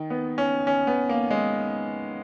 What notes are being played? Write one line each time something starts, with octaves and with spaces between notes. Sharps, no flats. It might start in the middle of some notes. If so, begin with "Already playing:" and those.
Already playing: D#3
B3
C#4
C#4
B3
A#3
G#3